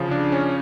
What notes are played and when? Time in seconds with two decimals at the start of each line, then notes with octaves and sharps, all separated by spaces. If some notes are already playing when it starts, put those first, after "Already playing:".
Already playing: C#3 F3
0.11 D4
0.32 C#4